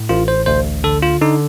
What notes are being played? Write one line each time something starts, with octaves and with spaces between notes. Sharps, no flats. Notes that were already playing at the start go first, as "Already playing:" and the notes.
Already playing: A2
A1 F4
C5
D2 C5
D3 A4
F4
D3 D#4